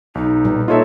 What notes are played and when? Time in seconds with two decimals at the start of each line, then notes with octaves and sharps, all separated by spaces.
0.15 B1 D#4
0.45 A#2 G3 B4
0.68 A#3 D#4 F4 A4 C#5 E5